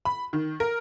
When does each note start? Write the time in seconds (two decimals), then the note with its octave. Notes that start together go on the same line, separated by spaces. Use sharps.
0.05 B5
0.33 D#3
0.60 A#4